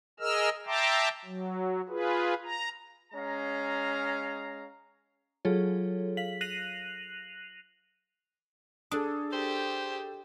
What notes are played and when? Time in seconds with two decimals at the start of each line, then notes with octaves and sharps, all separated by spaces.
0.20 G#4 A#4 D#5 E6 F6
0.66 E5 G5 A5 A#5 C6 D6
1.25 F#3
1.89 F4 G#4 B4
2.45 A#5
3.12 G#3 C#4 F5 A#5
5.45 F#3 F4 G#4 A4 C#5
6.17 F5 B6 F#7
6.41 F#6 A#6 C7 D#7 F7 F#7
8.91 D4 G#4 A4 D#6
9.32 G4 C5